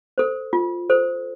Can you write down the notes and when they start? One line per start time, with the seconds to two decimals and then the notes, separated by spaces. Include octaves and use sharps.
0.18 A4 C5
0.53 F4
0.90 A4 C5